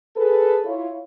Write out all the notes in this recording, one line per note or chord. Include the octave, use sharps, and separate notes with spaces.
G#4 A4 B4
E4 F4 C#5